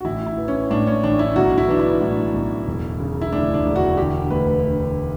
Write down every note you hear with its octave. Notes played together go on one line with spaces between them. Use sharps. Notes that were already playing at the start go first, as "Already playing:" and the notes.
F#4
A1 E4
E4
E3
C#4
A2 D4
C#4
A1 D4
E4
B1 F#4
E4
E3 D4
E4
A2
B1
E1
C#3
E4
D2 D4
D4
E1
F#4
D3 G4
D2 B4
D3